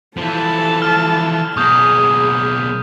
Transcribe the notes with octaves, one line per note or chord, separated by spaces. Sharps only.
E3 F3 A4 A5
F6
B1 A#3 G#4 C#6 D#6 G6